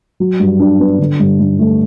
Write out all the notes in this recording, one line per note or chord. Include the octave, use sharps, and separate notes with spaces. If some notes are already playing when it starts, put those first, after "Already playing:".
F#3
G2
D4
B3
D3
G2
G2
A3